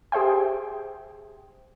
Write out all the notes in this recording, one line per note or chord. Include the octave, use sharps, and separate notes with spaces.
G4 G#4 C5 E5 G5